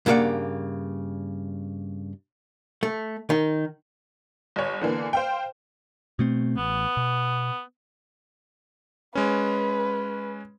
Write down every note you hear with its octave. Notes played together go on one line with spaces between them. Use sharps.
G2 C#3 A#3 G#4 D5 F#5
A3
D#3
G1 C#5
D3 E3 A#3 B3
C5 F5 G5
B2 A3 C4
A1 B3
B2
G#3 C#4 B4